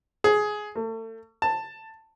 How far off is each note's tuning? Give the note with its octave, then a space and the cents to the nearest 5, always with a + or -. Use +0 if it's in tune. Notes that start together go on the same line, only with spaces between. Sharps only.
G#4 +15
A3 +35
A5 +10